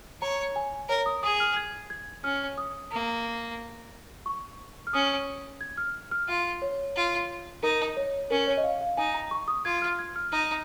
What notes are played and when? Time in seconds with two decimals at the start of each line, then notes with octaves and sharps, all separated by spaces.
0.22 C#5 A#5
0.56 G#5
0.89 A#4 C#5
1.06 D#6
1.23 G#4 D#6
1.40 F6
1.56 G#6
1.90 G#6
2.24 C#4 F6
2.58 D#6
2.91 A#3
4.26 C#6
4.87 F6
4.93 C#4 D#6
5.61 G#6
5.78 F6
6.11 F6
6.28 F4
6.62 C#5
6.96 F4
7.63 D#4 A#4
7.97 C#5
8.30 C#4 A#4
8.47 C#5
8.57 D#5
8.64 F5
8.81 F5
8.97 D#4 G#5
9.14 A#5
9.31 C#6
9.48 D#6
9.65 F4 G#6
9.82 F6
9.99 G#6
10.16 F6
10.32 D#4